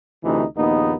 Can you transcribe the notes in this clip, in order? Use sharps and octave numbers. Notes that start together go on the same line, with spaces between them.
D2 C3 E3 D#4
A#1 D#2 B3 D#4